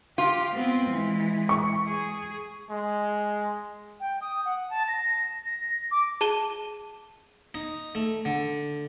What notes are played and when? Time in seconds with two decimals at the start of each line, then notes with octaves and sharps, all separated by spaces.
0.18 F4 G4
0.54 B3 C4
0.91 E3 G#3
1.49 C#6
1.87 G#4
2.70 G#3
4.00 G5
4.21 D#6
4.45 F#5
4.70 A5
4.88 A#6
5.46 A#6
5.91 D6
6.21 G#4 A5 D#7 G7
7.54 D#4
7.95 A3
8.25 D3